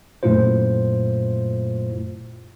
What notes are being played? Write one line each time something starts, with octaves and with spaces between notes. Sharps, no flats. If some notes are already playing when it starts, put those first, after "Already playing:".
F#2 A#2 A3 E4 F4 C5